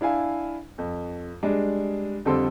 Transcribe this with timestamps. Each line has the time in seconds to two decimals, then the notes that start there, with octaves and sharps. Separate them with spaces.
0.01 D4 E4 F5 G#5
0.78 F2
1.43 G3 G#3 D4
2.25 F2 D3 G3 C4 A4 C6